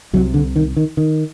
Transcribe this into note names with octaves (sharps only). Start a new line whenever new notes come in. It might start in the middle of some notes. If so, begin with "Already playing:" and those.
C2 C3 F#3
D3
D#3
D#3
D#3